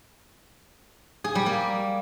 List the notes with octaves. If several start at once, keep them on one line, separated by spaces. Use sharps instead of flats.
G#4
G3
A#3